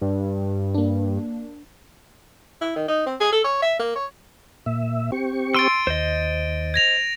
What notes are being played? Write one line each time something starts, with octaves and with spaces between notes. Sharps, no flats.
G2
A#3 D4
E4
D#3
D#4
C4
G#4
A4
C#5
E5
A#3
C#5
A#2 E5
C4 G4 C#6
C6 E6 A6 D7 D#7
D#2 C5 D#5
G#6 A#6 F7